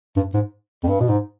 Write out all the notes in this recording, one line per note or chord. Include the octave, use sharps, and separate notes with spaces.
G2
G#2
F2
G2
B2
G#2